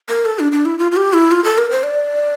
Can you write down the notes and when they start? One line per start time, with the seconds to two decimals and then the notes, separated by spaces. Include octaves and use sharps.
0.09 A#4
0.25 A4
0.39 D4
0.52 D4
0.65 E4
0.79 F4
0.92 F4
0.97 G4
1.13 E4
1.31 F4
1.44 A4
1.58 A#4
1.71 C5
1.83 D5